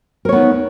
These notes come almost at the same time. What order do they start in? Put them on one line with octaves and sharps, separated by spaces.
A#4 C#5 B3 D#4